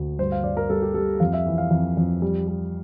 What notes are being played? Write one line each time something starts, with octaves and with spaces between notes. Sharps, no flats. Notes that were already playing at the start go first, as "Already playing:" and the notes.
Already playing: D2 D3
G2 C5
F5
G2 D5
A#4
G3 A4
G4
G3 A4
F2 F5
E5
E3
F5
F2
F2
G3
G3